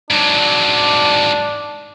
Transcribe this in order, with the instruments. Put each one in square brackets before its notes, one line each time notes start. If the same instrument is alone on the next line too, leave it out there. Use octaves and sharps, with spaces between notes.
[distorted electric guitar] G#2 F#3 [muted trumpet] D4